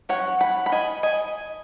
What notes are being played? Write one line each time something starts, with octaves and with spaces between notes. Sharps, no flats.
F#3 C#4 C#5 F#5
F#5 B5
B5
D#5 G#5
D#5 G#5